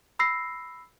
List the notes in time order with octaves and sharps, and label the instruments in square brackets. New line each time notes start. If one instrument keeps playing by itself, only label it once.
[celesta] B5 E6 A#6 C7